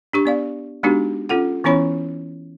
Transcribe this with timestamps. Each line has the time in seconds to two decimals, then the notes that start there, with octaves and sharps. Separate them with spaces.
0.13 D4 G4 C#6
0.25 B3 D5 F5
0.83 G#3 B3 D4 D#4 F#4 G4
1.29 C#4 F4 A4 F#5
1.64 E3 B3 C#4 E4 C#5 B5